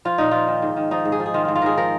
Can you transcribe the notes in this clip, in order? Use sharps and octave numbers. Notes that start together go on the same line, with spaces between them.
F3 F4
A#2 D#4
F3 F4
D#3
G#2
D#3
F3 D#4
G#2
G#4
F3
G#4
D#3 F4
G#2 F4
F4
D#3 G#4 A#4
F3 A#4